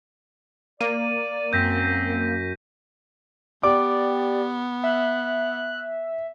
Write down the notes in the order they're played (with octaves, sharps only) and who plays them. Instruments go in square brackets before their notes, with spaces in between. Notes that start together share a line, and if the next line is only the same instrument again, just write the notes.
[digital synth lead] A#3 [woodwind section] D5 [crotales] D#7
[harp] F#2 [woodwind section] C4 [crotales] G6 A#6 B6
[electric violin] B3 [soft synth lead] G4 [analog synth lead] D5 [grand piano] D6
[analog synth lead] E5 [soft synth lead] F#6